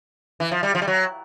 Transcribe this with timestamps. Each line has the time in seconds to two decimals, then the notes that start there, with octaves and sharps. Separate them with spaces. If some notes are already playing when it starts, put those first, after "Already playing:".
0.40 E3
0.51 F3
0.63 G3
0.75 F3
0.82 G3
0.88 F#3